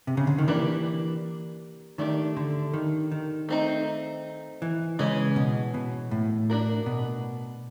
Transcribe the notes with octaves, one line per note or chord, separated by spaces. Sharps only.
C3
C#3
D3
D#3
E3 A#3 D4 G4 B4 D5
D#3 A3 D4 G4
D3
D#3
D#3
A3 C4 D#4
E3
C#3 E3 G#3 C#4
B2
B2
A2
D4 F#4 A#4
B2